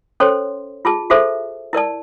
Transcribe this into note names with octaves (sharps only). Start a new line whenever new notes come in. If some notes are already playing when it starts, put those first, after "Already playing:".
C#4 A4 C5 C#5 C6
F4 G#4 A5
F#4 G#4 A4 C5 E5
E4 A#4 D5 A5